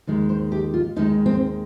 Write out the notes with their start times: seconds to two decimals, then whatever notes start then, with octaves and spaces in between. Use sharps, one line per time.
0.07 D#2 D#3 G#3
0.29 C5
0.52 G4
0.74 F4
0.96 D#2 D#3 G#3 D#4
1.26 C4